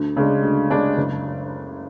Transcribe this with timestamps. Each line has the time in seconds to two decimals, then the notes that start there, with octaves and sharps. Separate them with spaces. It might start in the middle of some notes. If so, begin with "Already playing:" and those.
Already playing: D2
0.17 C#3 G#3 D4
0.43 D2
0.70 C#3 G#3 D4
0.97 F#1